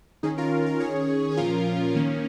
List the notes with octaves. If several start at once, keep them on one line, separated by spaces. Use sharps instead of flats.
D#3 C#4 D#4 G#4
F4 A#4
F4 A#4
D#3 C#4 G#4 C#5
G#4
A#2 F3 C#4 F4 A#4
D#3 A#3 C#4